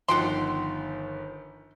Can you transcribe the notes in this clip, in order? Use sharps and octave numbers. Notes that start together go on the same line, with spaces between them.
G1 D#3 F3 F#5 G5 C6